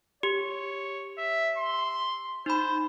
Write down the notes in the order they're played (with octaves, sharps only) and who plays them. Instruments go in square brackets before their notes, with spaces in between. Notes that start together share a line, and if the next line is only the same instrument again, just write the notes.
[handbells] G4 [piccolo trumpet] C#5
[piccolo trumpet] E5
C6
[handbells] D#4 B5 [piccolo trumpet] C5